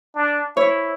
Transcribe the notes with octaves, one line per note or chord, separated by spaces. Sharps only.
D4
E4 C#5